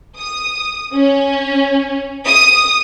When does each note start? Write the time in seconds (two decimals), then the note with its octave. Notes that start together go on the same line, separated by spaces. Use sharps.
0.18 D#6
0.95 C#4
2.26 D#6